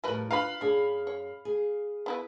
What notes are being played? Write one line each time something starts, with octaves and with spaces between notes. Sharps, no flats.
F2 A2 G3 A#4 B4
D4 F4 B4 F5 A#5 B5
F#2 D4 G#4
C#5
G#4
B3 E4 B4